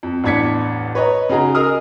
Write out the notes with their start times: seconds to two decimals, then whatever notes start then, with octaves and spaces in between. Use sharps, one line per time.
0.03 F2
0.24 A1 E2 D4 G#6 B6 C#7
0.95 B4 C#5 D#5 A#5
1.29 C#3 D#4 F#4 G#4 A#5
1.55 G#4 A#4 D#5 D#6 F6